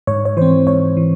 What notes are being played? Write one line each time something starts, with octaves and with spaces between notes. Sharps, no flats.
G#2 C#5
C#5
E3 C4 C5
G#2 C#5
E3